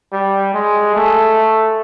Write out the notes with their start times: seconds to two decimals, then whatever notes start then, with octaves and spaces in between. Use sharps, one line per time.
0.12 G3
0.54 G#3
0.95 A3